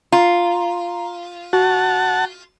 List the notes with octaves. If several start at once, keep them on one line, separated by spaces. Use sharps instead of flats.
F4 A#5
F#4 F#5 A5